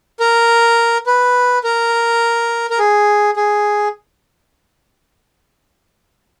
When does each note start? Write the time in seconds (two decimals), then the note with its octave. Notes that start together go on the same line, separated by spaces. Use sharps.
0.20 A#4
1.07 B4
1.64 A#4
2.70 A#4
2.79 G#4
3.37 G#4